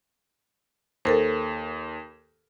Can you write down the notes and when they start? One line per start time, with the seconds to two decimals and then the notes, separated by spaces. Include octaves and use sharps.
1.05 D#2 A4 A#4 C5